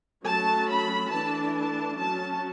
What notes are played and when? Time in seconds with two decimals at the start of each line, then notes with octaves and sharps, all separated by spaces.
0.24 F#3 A3 C#4 A5
0.69 B5
1.11 E3 A3 D4 A5
1.54 A5
1.97 F#3 C#4 A5